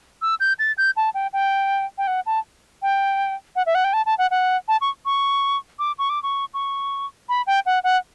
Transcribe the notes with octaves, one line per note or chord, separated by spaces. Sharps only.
E6
G6
A6
G6
A5
G5
G5
G5
F#5
A5
G5
F#5
E5
F#5
G5
A5
A5
F#5
F#5
A5
C#6
C#6
D6
C#6
D6
C#6
C#6
B5
G5
F#5
F#5